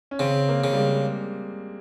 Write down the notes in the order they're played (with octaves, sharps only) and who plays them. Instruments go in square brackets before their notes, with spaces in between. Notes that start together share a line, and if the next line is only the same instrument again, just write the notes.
[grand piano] C#4
[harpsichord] C#3 [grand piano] C4
[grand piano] A#3
[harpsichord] C#3
[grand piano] G3
G#3